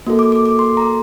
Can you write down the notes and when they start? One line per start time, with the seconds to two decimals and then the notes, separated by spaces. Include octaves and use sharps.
0.07 A#3 F#4 A4
0.19 D6
0.32 D6
0.46 D6
0.59 C6
0.77 A#5